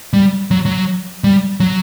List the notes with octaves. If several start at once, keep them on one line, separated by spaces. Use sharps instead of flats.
G3
F#3
F#3
G3
F#3